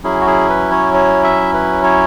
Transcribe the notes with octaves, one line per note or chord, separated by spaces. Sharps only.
F#3 C#4 E4 G#4
F#4
G#4
B4
C#5
C#5
E5
B4
C#5